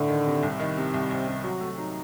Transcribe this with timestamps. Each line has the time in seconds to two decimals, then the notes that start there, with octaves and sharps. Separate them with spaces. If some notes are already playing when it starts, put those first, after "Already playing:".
Already playing: A2 D3
0.09 D#3
0.26 C3
0.43 C2
0.59 D#3
0.77 C3
0.94 C2
1.11 C2 C4
1.27 C3
1.44 F#3 F#4
1.61 A3
1.78 F#3 D#4